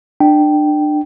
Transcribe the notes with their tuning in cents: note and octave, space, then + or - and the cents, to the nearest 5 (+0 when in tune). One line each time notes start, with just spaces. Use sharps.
D4 +30 G5 -10